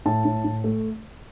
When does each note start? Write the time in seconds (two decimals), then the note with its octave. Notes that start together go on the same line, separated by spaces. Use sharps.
0.05 A2 A5
0.25 A2
0.44 A2
0.64 A3